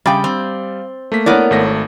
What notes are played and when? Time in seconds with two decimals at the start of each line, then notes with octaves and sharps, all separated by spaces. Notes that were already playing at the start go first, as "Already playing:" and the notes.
0.06 C#3 G3 F5 G5 B5 D6 A6
0.24 C4
1.12 A3 A#3 B6
1.26 B3 E4 A#4 C#5 D5
1.51 G#1 A3 A#6